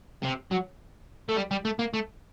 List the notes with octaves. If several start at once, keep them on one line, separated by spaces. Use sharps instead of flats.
C3
F#3
A3
G3
G3
A3
A#3
A3